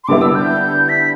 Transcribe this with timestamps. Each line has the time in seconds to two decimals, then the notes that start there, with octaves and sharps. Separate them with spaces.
0.04 C6
0.08 D3 G3 B3 E4 D6
0.22 E6
0.35 G6
0.89 B6